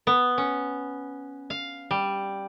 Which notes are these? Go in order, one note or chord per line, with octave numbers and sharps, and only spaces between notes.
B3
C#4
F5
G3